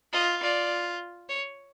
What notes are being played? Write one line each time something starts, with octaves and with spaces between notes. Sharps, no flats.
F4 D#5
F4 D5
C#5